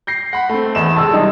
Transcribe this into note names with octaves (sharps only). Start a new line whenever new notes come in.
G6 A#6 C7
F#5 B5
A3 C4
E2 E7
C3 G#3 A5 E6
G3 D#4